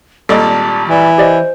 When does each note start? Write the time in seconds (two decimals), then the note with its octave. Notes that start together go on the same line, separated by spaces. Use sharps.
0.29 G#1 A#2 G3 A4 D#5 A5
0.90 E3 D5
1.18 G4 C5 D5 D#5